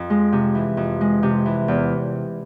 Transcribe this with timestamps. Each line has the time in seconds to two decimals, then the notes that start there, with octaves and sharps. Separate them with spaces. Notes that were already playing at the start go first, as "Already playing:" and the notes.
Already playing: F2
0.10 G#3
0.32 C3
0.55 E3
0.77 F2
1.01 G#3
1.23 C3
1.46 E3
1.68 E2